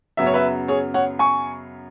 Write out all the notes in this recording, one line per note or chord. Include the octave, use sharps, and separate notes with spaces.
F#2 C#3 F#3 B3 E5
C#5
B4 E5
G#4 C#5
C#5 F#5
G#5 C#6